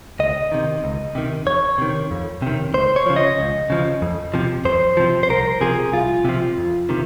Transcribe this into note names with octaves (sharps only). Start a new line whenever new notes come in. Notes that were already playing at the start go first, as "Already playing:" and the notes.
C#2 D#5
C3 D#3
C#2
C3 D#3
F2 C#5
C3 D#3
F2
C3 D#3
C#2 C5
C#5
C#3 F3
D#5
C#2
C#3 F3
F2
C3 F3
F2 C5
C3 F3
C5
C2 A#4
C3 F3 G#4
C2 F4
C3 F3
F2
C3 D#3